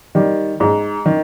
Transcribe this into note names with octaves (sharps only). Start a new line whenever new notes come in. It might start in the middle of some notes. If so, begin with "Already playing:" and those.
D#3 G3
G#2
D#3